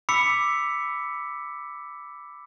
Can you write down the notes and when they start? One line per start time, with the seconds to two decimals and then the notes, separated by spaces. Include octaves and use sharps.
0.09 B5 D6 E6 B6 C#7